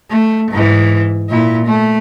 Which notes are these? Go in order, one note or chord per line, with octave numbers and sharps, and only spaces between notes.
A3
G#2 E3
A#2 E4
A3